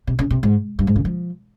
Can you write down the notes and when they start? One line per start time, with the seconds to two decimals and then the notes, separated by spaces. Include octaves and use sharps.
0.07 C3
0.19 C#3
0.31 C3
0.43 G#2
0.79 G2
0.87 G#2
0.96 C#3
1.05 F3